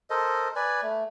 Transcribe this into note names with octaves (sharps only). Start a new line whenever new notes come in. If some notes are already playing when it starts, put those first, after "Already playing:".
A4 A#4 C5 D#5
B4 D5 G#5
A3